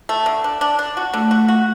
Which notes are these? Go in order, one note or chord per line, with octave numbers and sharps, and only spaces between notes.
A3
D3
D4
D4
D4
F#4
D3 A3
F#4
F#4